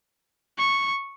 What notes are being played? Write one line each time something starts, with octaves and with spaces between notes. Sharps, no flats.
C#6